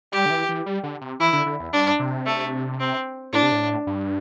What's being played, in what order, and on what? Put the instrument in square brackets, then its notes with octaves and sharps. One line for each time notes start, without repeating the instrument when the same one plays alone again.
[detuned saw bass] G3 [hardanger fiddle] G4
[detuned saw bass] D3
E3
E3
G3
D3
C3
[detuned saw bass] E3 [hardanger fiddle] E4
[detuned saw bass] D3
D3
E2
[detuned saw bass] G2 [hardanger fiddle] D4
[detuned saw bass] C3
[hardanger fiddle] A3
C4
[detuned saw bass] A2 [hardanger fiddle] D4
[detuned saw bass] C3
A2
G2